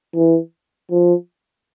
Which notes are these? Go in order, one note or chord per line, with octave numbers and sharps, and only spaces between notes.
E3
F3